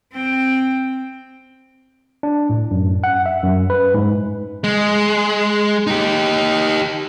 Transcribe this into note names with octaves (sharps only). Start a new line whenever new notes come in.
C4 G5
D4
A2
F#2
F#5
E5
F#2
B4
G#2
G#3
D#4 G4